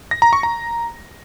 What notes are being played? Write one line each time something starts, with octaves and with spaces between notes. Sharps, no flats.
A#6
A#5
C#6
A#5